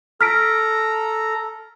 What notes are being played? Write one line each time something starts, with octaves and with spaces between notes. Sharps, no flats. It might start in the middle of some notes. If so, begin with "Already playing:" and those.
A4 A#5 F6 B6 D7